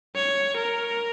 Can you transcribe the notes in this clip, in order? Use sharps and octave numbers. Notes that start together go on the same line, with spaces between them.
C#5
A#4